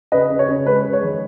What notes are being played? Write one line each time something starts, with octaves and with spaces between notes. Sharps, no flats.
C#3 B4 D#5
C#3
C#5
C#3
G#3 B4
G#3
C#5
D#3